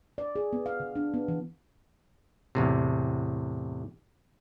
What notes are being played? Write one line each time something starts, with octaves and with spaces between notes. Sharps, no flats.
D5
G#4
B3
F5
D3
D4
B3
E3
E2 A2 C3